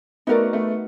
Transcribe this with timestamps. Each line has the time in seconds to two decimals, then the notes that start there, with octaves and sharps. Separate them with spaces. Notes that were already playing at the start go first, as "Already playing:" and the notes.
0.27 A3 B3 D#4 F#4 A#4 D5
0.53 A3 B3